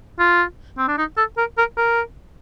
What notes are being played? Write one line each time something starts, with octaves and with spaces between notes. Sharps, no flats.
F4
C4
D4
D#4
A4
A#4
A#4
A#4